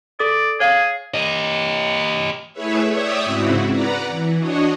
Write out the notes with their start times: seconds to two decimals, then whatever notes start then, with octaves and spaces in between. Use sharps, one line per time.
0.20 A4 D5 D#6
0.60 G#4 C#5 F5
1.14 G4 D#5
2.53 A3 E4 G#4 B4 C#5 E5
2.89 C#5 D5 E5 G5 D#6
3.24 G#2 C#3 C4 E4 F#4
3.70 B4 D5 F#5 A#5
4.08 E3
4.39 D4 F#4 C#5 D#5